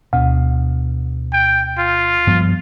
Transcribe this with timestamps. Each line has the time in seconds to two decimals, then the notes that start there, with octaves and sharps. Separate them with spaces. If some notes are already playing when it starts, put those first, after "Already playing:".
0.13 D2 B2
1.33 G5
1.78 F4
2.27 G2 F3 B3